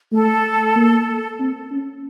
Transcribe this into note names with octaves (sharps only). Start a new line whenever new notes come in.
A3 A4
A#3
C4
C#4